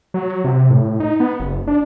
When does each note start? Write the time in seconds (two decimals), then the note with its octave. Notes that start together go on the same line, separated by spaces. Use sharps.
0.14 F#3
0.44 C3
0.70 A2
1.00 D#4
1.20 B3
1.40 F#1
1.67 D4